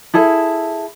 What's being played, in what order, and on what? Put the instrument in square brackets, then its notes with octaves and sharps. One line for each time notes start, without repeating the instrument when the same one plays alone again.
[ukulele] E4 G#4 A4 E5